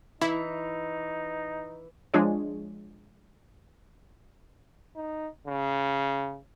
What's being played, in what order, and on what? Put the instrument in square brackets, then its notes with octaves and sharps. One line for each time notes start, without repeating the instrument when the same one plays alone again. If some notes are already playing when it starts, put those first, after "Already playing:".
[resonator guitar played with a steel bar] E3 [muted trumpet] D#4 [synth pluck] E4
[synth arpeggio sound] F3 G#3 D4 F4 G#4 C#5
[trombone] D#4
C#3